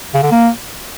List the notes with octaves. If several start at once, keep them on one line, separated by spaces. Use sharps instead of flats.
C#3
D3
A#3